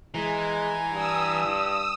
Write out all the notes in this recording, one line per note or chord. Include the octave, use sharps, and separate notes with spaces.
E3 G#3 G#5 A#5
G2 D#6 E6